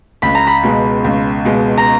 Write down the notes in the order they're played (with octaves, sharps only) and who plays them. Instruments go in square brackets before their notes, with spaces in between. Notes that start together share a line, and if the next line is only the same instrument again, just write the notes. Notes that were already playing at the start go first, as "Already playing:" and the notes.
[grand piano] C#2 [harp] B5
[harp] A#5
B5
[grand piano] B2 G#3
C#2
B2 G#3
[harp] A#5